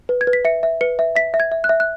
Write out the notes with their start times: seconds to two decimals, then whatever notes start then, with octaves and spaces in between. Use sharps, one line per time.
0.09 B4
0.21 G#6
0.27 B4
0.33 B6
0.45 E5 C#7
0.63 E5
0.81 B4 C#7
0.99 E5
1.16 E5 B6
1.34 E5
1.40 G#6
1.52 E5
1.64 F#6
1.69 E5
1.80 F#6